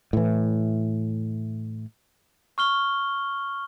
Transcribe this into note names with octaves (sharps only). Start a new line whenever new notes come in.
A2 E3
C#6 F6 G7